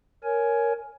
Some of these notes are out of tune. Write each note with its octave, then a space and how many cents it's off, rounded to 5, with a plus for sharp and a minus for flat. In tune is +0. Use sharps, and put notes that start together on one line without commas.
A#4 +0 C#5 +5 G#5 +10